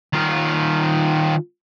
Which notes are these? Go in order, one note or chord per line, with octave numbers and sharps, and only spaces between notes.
D#3 F4